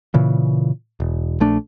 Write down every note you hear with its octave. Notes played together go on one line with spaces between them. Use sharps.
A#2 C#3 E3
E1
A#1 A3 D4